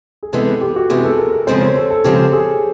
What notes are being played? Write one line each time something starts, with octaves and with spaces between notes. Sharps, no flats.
G#4
C3 E3 G#3 B3 A4
G4
F#4
C3 E3 G#3 B3 G#4
A4
A#4
A#4
C#3 F3 G#3 C4 C5
C#5
A4
A4
C#3 F3 G#3 C4 G4
G#4